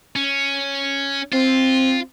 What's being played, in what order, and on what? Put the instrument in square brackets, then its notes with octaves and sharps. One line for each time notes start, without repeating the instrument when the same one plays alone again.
[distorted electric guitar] C#4
[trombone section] C4 [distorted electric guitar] F4